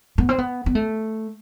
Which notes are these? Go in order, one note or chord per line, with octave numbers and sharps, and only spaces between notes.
B3
C4
B3
B3
A3